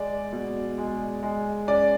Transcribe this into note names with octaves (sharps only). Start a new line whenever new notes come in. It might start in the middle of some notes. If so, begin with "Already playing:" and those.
Already playing: G#3 D5
B2
G#3
G#3
C#4 D5